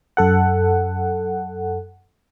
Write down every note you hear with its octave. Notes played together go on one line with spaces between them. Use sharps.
F#2 A4 F#5